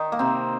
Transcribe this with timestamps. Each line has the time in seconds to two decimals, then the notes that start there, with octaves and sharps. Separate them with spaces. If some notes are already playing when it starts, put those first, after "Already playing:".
Already playing: D#3 D#4
0.12 A#3
0.19 C3 C4